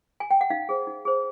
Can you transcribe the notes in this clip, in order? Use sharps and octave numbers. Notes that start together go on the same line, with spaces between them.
G#5
G5
F#5
D#4 F5
G#4 C5
D#4
G#4 C5